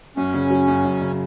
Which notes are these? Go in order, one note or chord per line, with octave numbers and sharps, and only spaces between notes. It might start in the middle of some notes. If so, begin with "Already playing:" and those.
F#2 C#4
C#3
F#3
F#2
F#2
C#3